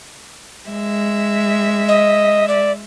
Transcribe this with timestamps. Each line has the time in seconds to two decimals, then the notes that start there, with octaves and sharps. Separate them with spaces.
0.69 G#3 E5
1.88 D#5
2.48 D5